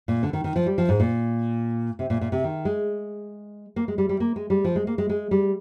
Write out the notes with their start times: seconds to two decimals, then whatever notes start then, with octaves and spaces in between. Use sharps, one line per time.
0.08 A#2
0.23 D3
0.33 D#3
0.44 D#3
0.56 F3
0.66 G3
0.78 F3
0.89 G#2
1.00 A#2
1.99 C3
2.10 A#2
2.21 A#2
2.32 C3
2.44 D#3
2.65 G#3
3.76 A#3
3.88 G#3
3.98 G3
4.09 G3
4.20 A#3
4.36 G#3
4.50 G3
4.64 F3
4.76 G#3
4.87 A#3
4.98 G#3
5.09 G#3
5.31 G3